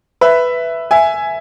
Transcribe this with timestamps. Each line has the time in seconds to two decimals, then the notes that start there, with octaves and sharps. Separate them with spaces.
0.21 B4 E5
0.91 E5 G#5